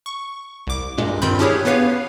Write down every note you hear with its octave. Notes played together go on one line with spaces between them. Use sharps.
C#6
C2 D6
G2 A#2 G#3
G2 D#3 C4 F4 B5 G6
C#4 D4 E4 G4 G#4 C#5
B3 G4 B4 C#5 F5